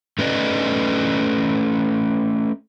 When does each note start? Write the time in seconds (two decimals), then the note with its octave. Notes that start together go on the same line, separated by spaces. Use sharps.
0.19 A3 C#4 B4 D5 D#5